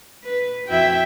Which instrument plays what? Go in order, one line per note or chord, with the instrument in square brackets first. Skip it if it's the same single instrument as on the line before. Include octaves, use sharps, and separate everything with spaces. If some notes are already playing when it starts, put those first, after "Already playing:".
[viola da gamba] B4
[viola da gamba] F2 E4 F#4 [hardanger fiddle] E5 G5